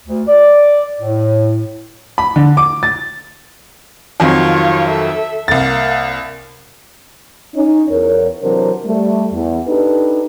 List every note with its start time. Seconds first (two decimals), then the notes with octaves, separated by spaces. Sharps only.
0.07 D2
0.28 D5
1.01 A2
2.18 B5
2.36 D3
2.57 D6
2.83 A6
4.20 F2 D#3 F#3 F4 C#5
4.88 A4 E5
5.48 C2 A#3 A6
7.55 C#4 D#4
7.89 E2 A#4 C#5
8.42 C3 E3 F#3 D4 A#4 C5
8.85 G3 A3
9.32 E2
9.66 D4 D#4 G4 A4 B4